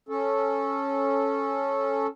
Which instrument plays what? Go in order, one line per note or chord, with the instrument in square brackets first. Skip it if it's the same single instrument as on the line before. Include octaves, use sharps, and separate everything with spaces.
[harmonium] C#4 A4